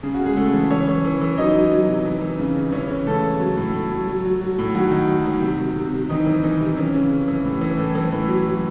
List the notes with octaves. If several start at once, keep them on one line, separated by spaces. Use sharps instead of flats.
C#3 G#4
F#4
C#3
G#3 G#4
C#3 A3 A4
E3
E3 C#4 C#5
E3
E3
E3
F#3 D#4 D#5
F#3
F#3
C3
E3
E3
C#3
C#3
E3 C#4 C#5
C#3
C#3 A3 A4
C#3
F#3
A2
A2
F#3
F#3
F#3
F#3
A2
D#3 F#3 F#4
D#3
F#3
D#3
C3
C3
C3
C3
D#3 E3 D#4
E3
D#3 E3 D#4
C3
E3 C#4
C#3
C#3
E3
A2
E3
A2
E3
A2
F#3
F#3